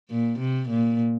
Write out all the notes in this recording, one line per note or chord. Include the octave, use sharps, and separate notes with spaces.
A#2
C3
A#2